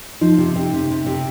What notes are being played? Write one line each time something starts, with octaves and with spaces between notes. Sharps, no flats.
F3 D#4
C3
C3
C3
C3
C3